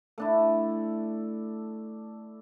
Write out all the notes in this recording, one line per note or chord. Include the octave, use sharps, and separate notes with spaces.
A3 D4 E4